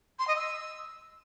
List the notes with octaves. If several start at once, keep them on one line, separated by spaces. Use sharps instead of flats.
C6
D#5
E6